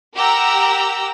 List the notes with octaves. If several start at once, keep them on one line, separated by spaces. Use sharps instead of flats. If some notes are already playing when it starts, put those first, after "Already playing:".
G4 A#4 F#5 A#5 E6